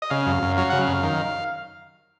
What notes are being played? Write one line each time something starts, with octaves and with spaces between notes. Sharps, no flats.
D#5
C#3 F5
F#2
F#2
F#3 F5
C#3 F#5
F5
F#2
D#3